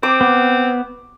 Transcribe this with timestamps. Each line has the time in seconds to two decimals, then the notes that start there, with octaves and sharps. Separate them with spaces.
0.03 C4 D6
0.21 B3